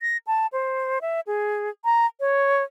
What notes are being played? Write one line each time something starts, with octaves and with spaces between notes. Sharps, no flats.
A#6
A5
C5
E5
G#4
A#5
C#5